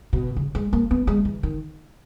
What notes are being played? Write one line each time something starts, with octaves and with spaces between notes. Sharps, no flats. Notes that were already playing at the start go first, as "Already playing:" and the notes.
B2
C#3
G#3
A#3
B3
G#3
E3
D#3